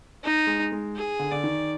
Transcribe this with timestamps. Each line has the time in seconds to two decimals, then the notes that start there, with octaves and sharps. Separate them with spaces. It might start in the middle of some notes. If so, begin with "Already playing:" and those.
0.23 D#4
0.47 G#3
0.72 G#3
0.95 G#4
1.19 D3
1.32 D3 D5
1.43 D#3